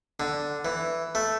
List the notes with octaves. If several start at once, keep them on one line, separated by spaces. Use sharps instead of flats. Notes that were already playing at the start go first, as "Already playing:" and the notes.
D3
E3
A3